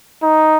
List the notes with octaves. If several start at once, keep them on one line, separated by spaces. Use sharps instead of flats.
D#4